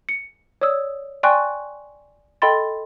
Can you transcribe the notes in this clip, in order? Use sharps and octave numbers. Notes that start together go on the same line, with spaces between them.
C#7
C#5 D5 D#6 E6
D5 G5 G#5 C6 C#6 F#6
A4 D#5 G5 B5 C6 A6